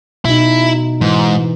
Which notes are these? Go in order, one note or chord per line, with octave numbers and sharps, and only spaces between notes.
B2 D#4 E4
G#2 E3